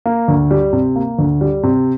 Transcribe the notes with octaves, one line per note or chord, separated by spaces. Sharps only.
A#3
D2
G3
C3
A#3
D2
G3
C3